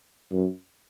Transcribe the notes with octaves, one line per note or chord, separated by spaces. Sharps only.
F#2